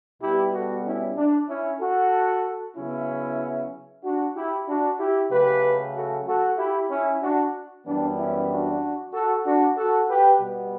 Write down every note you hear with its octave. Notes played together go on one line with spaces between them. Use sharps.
B2 G3 B3 E4 G4
F#4 A4
C#4 E4
D4
C#4 E4
F#4 A4
C#3 F#3 B3 C#4 E4
D4 F#4
E4 G4
D4 F#4
E4 G4
C#3 F#3 A3 G4 B4
F#4 A4
F#4 A4
E4 G4
C#4 E4
D4 F#4
F#2 E3 G3 B3 D4
C#4 E4
D4 F#4
F#4 A4
D4 F#4
F#4 A4
G4 B4
B2 G3 B3